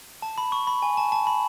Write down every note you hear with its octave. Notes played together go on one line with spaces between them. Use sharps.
A5
B5
C#6
B5
G#5
A5
A5
B5